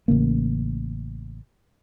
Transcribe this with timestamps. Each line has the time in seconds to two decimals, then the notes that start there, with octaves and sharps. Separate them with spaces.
0.08 A1 C#3 A#3